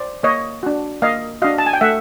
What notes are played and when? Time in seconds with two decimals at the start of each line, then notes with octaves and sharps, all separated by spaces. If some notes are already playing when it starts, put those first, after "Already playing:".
Already playing: C5 D5
0.23 A#3 C#5 D#5
0.63 D4 F#4
1.02 A#3 D#5 F5
1.42 D4 F#4 D#5 F5
1.58 A5
1.66 G#5
1.73 G5
1.81 A3 E5 F#5